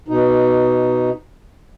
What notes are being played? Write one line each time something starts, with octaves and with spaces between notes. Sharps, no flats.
B2 D#4